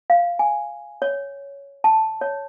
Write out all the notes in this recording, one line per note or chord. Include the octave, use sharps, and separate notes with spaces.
F5
G#5
C#5
A5
C#5